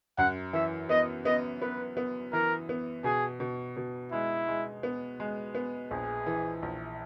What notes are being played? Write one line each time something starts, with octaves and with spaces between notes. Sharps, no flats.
F#2 F#5
E3 E5
B3 D#5
B3 D#5
B3 B4
B3
E3 A#4
B3
B2 G#4
B2
B2
G#3 E4
G#3
B3
G#3
B3
A#1 G#4
E3
A#1